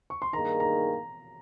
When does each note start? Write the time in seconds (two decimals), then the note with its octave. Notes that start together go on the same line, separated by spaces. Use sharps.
0.10 C#6
0.22 C6
0.33 G2 D#3 A#3 D#4 G#4 A#5
0.60 A#5